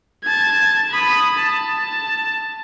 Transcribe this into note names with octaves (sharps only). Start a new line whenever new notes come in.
A5 G#6
B5 D#6
A5